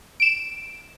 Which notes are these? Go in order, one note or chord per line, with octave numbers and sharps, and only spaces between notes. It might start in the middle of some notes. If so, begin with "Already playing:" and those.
D7 E7